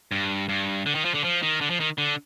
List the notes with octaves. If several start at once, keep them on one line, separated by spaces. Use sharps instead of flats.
G2
G2
D3
D#3
F3
D3
F3
D#3
D3
F3
D#3
D3